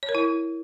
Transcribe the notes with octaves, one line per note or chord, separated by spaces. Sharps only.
C#5
A#4
E4